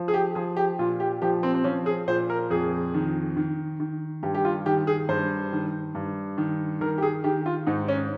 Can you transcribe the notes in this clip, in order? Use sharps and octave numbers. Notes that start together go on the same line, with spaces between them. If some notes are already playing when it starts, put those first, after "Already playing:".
Already playing: F3
G#4
G4
F3 G#4
G4
A#2 F4
G4
F3 G4
C4
C4
F3 C#4
G#4
A#2 C5
A#4
F2 G#4
D#3
D#3
D#3
G2 G4
G4
F4
D#3 G4
G#4
G2 C5
D#3
G2
D#3
D#3 A#4
G4
G#4
D#3 G4
F4
G#2 D#4
C#4